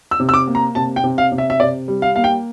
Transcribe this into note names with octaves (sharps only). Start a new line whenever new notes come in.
E6
C3
E6
D6
A#3
A#5
C3 A5
G5
C3
F5
C3
E5
E5
C3 D5
G3
F5
A#3 F5
G5